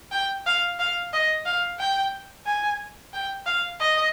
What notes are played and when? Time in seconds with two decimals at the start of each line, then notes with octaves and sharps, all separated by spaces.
0.12 G5
0.46 F5
0.79 F5
1.13 D#5
1.46 F5
1.79 G5
2.46 G#5
3.14 G5
3.46 F5
3.80 D#5